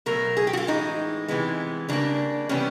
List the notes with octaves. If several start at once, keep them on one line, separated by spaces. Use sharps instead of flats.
B2 F#3 A3 A#4
G#4
G4
F#4
F4
A2 E3 G#3 D#4
C3 E3 G#3 B3
C#3 E3 G3 A#3 D4
C3 E3 G3 B3 C#4